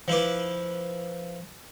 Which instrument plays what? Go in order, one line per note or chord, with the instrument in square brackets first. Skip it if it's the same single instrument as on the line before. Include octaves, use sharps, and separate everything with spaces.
[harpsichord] F3 E4 B4 D6